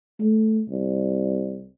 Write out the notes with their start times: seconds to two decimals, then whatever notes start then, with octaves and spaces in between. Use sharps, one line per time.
0.20 A3
0.69 C2